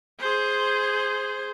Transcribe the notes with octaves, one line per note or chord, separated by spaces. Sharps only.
G#4 C5